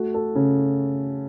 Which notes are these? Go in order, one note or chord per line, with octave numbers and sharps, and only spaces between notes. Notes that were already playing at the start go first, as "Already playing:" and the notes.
Already playing: A3 F#4
A4
C#3